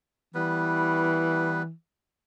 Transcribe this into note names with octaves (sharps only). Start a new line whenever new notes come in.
E3 G3 B3 B4